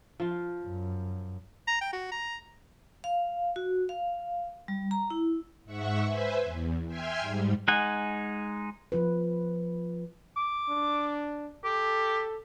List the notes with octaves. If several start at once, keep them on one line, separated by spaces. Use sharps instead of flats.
F3 F4
F#2
A#5
G5
F#4
A#5
F5
F#4
F5
G3
A#5
E4
G#2 E5 F#5 C#6
B4 C5 E5 G#5
E2
E5 G5 G#5 C6 F6 G#6
G#2 G3
G#3 D#4 F#5 G#5
F3 F4 B4
D6
D4
G4 A4